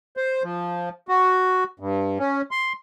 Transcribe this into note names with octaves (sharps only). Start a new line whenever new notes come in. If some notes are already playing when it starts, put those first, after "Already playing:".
C5
F3
F#4
G2
C#4
C6